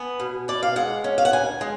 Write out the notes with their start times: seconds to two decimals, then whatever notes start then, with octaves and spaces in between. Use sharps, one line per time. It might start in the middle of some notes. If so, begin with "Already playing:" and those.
Already playing: B3 G#5
0.20 B2
0.48 B2 D5
0.63 F5
0.76 G#3 F#5
1.04 C#4
1.18 F5
1.25 F#5
1.32 D2 G#5
1.61 G#3